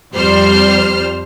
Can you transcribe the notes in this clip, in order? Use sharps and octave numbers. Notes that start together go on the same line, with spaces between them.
F2 G3 C5 F6